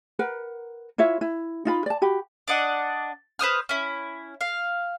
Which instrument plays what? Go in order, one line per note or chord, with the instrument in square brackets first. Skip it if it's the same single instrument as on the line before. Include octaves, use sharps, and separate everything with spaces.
[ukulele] A#4 B4 F#5
E4 F4 C#5 E5
E4
D#4 F4 B5
D5 A5
F#4 G4 B5
[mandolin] D4 D5 D#5 F#5
B4 C5 D#6 F6
C#4 E4
F5